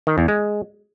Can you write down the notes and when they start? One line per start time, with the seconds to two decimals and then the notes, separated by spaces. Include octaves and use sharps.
0.07 D#3
0.18 E2
0.28 G#3